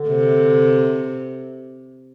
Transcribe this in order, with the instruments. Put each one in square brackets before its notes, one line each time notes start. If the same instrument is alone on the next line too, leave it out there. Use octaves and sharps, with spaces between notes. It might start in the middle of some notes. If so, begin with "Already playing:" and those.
Already playing: [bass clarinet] D3
[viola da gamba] C3